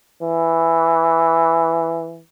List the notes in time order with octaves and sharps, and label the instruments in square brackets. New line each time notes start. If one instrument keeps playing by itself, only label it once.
[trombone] E3